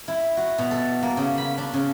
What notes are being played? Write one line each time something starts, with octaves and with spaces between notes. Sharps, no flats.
E4
F#4
B2
A4
A#3
C#3
B5
D4
C#3